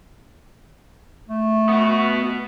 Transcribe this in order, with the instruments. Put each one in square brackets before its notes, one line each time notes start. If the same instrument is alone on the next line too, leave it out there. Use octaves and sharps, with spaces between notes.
[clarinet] A3
[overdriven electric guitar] B3 F#4